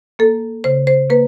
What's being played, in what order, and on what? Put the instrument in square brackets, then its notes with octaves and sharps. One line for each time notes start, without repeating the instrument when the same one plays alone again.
[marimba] A#3 A4
C#3 C5
C5
A#3 B4